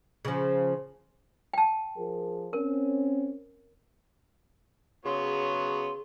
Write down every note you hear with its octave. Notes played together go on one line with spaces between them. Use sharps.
C#3 F3
G5 A5
F3 G#4 A#4
C4 C#4 A#4
C#3 F#3 B3 G#4 C#5 C6